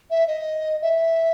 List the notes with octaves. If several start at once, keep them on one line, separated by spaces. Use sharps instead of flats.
E5
D#5
E5